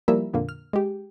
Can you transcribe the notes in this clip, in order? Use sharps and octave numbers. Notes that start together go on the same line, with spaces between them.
F3 G3 A#3 E4 A#4 E5
F2 A#2 D3 A#3
F6
G#3 G4